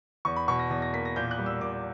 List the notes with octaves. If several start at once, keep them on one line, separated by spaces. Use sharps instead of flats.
E2 C#6
B5
B2 C#6
A#6
E2 A#6
A#6
A#3 B6
A#6
A#2 G6
F#6
G3
E6
A#2 D6